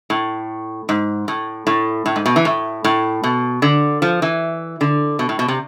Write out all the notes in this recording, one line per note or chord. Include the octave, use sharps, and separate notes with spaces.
A2
G#2
A2
A2
A2
G#2
B2
E3
A2
A2
B2
D3
F3
E3
D3
B2
A2
B2
C3